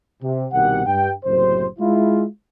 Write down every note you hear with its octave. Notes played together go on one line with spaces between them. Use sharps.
C3
C2 B2 D#3 G4 F#5
G2 G5
F#1 F#2 A2 C3 C5
G#3 E4 F4